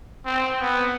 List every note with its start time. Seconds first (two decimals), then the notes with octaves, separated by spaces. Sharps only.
0.26 C4
0.61 B3